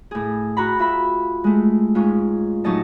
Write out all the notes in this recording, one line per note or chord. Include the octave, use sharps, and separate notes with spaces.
A2 G#4
F#4 A#5 B5
F4 E5 B5
G#3 A3
G#2 C#4 F4
A2 F#3 C#4 D#4 D#5 A5